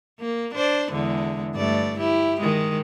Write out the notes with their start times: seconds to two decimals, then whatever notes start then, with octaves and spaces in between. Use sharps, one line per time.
0.20 A#3
0.55 D4 C5 D5
0.92 E2 D3 G#3
1.55 G2 A3 D5
1.98 E4 G4
2.41 D#3 G#3